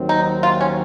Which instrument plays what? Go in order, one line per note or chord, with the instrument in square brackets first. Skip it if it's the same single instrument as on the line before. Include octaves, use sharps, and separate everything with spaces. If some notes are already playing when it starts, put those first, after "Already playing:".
Already playing: [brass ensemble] D#2 D#3 F#3 C4
[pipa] D#4
F4
C#4